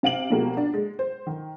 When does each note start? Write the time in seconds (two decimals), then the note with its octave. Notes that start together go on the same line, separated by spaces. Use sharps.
0.03 C3 F5 D7 F#7
0.30 B2 F3 G3 G#3 A#3
0.57 D4
0.74 G#3
0.99 C5
1.27 D#3